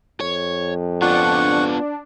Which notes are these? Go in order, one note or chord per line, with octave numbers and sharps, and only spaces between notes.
F2 C#5
B3 D4 F4 F#5 C#6